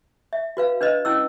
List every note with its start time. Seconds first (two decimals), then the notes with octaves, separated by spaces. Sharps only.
0.33 E5
0.57 F#4 B4 F5
0.81 D4 B4 C5 D#5
1.05 C#4 E4 E6